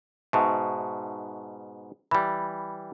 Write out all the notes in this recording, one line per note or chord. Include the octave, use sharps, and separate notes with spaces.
G#2 B2 E5 A5 C#6
E3 G3 B5